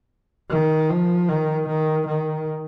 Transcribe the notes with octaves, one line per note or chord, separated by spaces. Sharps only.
D#3
F3
D#3
D#3
D#3